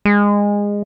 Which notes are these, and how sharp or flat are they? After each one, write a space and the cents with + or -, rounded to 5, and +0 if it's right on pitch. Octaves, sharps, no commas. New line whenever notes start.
G#3 -20